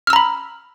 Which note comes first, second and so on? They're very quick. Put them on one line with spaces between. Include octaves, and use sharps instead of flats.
F6 E6 A#5 B5